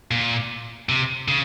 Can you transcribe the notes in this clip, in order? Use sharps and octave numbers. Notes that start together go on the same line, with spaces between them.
A#2
C3
C#3